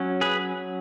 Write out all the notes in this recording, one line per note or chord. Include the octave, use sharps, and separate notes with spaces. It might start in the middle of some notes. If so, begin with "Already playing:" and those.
Already playing: F#3 C#4
G#4 B4